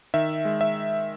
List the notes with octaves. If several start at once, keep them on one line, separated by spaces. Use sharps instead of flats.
D#3 E5
G#3
E5